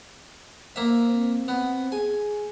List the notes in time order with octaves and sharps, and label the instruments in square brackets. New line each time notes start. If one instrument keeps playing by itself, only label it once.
[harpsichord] A#3 E5 [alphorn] C5
[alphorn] C4
[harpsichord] B3
[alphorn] G#4 [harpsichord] G#5